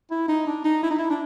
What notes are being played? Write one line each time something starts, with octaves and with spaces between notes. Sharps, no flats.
E4
D#4
D4
D#4
E4
D#4
E4
D4